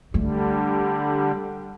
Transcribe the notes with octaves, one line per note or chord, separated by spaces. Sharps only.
D3 G3 A3